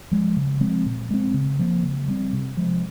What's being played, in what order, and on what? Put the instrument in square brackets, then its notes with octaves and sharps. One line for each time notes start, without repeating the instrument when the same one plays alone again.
[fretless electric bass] F3 G#3
C#3
F3 G#3 C4
A#2
G#3 C4
C#3
F3 A#3
C#3
G3 C4
C3
F3 G#3